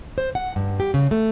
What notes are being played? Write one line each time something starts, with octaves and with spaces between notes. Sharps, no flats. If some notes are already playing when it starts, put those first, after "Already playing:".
C5
F#5
G2
G4
C#3
A3